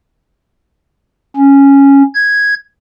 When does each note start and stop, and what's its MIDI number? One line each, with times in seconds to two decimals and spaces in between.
1.37 2.03 61
2.14 2.54 92